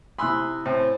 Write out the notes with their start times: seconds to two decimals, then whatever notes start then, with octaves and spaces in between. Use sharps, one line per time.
0.18 C3 E4 G#5 B5 C6 D#6 E6 F#6
0.66 A2 C4 C5 E5 G5